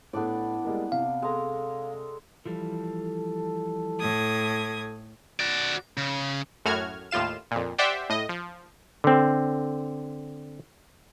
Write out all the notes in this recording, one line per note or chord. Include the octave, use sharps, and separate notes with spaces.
A2 A3 B3 D4 E4 D5
G3 G#3 A#3
C3 F5
G#3 A4 A#5
E3 F3 G3 A4
A2 D#6 G#6
F#4 D5
C#3
F#2 A2 F#4 F6 G#6
D#2 A2 F4 F5 E7
F2 A#2
G4 C5 D5 E5 F#5 G5
A2 D#5
F3
D3 C4